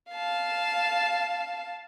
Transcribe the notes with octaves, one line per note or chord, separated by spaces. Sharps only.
F5 A5